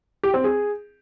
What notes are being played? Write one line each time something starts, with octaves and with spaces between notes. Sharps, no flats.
G4
C4
G#4